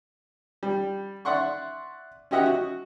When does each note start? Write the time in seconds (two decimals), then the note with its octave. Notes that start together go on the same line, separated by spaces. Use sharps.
0.63 G3
1.25 D5 E5 F#5 C6 C#6
2.31 C#4 F#4 G4 D#5 E5 F#5
2.46 F#4